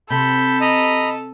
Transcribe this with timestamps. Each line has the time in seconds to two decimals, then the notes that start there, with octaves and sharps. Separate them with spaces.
0.10 C3 A4 B5 G6
0.61 D#5 A#5 B5